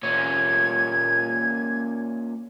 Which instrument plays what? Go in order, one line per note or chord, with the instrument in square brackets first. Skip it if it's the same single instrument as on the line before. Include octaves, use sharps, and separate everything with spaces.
[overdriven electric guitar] A#2 C#4 [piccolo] G#6